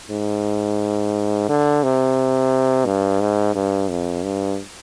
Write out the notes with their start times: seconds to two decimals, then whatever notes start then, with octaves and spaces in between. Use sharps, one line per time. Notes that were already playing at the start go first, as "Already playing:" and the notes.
0.11 G#2
1.49 D3
1.84 C3
2.86 G2
3.21 G#2
3.55 G2
3.89 F2
4.23 G2